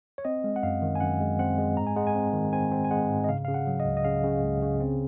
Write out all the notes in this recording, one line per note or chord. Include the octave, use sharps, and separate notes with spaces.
C#5
C4 D#5
G#3
F#5
F#2 F5
D#3
G#5
F#2 F#5
G#3
C4 F#5
G#3
G#2 A#5
G#5
G#3 F#5
G#5
C4
D#3
C4 G#5
C4
G#5
G#3 F#5
G#2
D#5
C#3 F5
C#3 F5
F#5
F#3
D#5
C#2
D#5
C#3 F5
C#3
C#2
C#3
C4